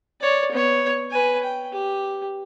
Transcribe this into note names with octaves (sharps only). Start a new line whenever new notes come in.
C#5 D5
B3 C#5
B4 G#5
G5
G4